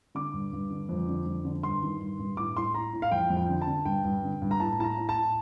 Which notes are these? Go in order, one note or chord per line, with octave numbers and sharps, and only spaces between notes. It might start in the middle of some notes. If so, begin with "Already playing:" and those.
D3 D6
G2
G2
D3
F2
D3
F2
D3
G2 C6
D#3
G2
G2
A2 D6
A2 C6
A2 A#5
A2
F5
F2 G5
F2
G5
D3
A5
D3
G2 G5
G2
D3
G2
A#5
A2 A5
A2 A5
A#5
A2
A5
A2